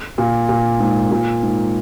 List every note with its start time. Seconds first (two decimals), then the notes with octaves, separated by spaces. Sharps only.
0.18 A#2
0.49 A#2
0.80 G#2
1.11 A#2
1.43 G#2